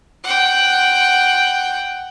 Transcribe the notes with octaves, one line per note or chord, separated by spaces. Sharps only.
F#5 G5